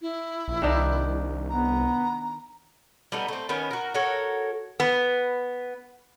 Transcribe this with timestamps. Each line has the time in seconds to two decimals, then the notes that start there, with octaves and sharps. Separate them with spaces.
0.02 E4
0.48 A#1
0.62 C2 D#3 D4 D#4
1.50 B3 A#5
3.12 G3 A3 B3 D#4
3.28 A3 C4
3.49 D#3 B3 C#4
3.71 F#4 A#4
3.94 F#4 A4 A#4 C#5
4.80 B3